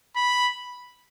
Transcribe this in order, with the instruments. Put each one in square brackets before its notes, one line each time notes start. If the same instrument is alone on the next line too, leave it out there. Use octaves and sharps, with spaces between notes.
[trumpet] B5